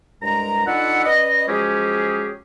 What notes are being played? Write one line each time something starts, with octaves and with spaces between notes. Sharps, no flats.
C2 G2 G#3 A#5
D4 D#4 F4 A4 B4 F#5
C#4 B4 D5 D#5
F3 F#3 G#3 C#4 G4 G#4